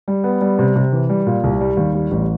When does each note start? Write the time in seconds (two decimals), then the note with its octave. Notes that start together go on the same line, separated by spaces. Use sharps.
0.08 G3
0.24 B3
0.41 G3
0.59 C3
0.76 C3
0.92 E3
1.09 G3
1.27 A#2
1.44 C2
1.61 G3
1.77 D#2
1.95 G3
2.11 A1